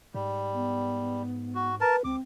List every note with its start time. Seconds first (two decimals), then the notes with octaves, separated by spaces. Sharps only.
0.14 G#2 G3
0.54 B3
1.55 F#4
1.81 A#4 B4 A5
2.05 C#2 C4 D6